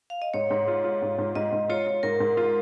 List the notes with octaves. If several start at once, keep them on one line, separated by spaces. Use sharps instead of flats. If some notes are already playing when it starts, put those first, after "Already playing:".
F5
D#5
G#2 C#5
G#2
F4
F4
G#2
G#2
G#2 D#5
G#2
F4 C#5
F4
G#2 A#4
G#2
F4